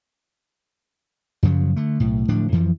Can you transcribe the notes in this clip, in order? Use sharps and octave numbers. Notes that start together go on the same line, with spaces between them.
F#2 C#3 F3 F#3
D3 A3
B1 A2
D1 A2 F3 D4
F2 E3 F3